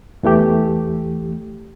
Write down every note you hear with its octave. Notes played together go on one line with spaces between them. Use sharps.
E2 E3 A3 G4